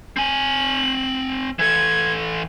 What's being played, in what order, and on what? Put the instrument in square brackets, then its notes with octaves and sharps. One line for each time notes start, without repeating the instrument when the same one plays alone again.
[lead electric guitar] C4 G#5 [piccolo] F#7
[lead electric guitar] E3 A4 [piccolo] G#6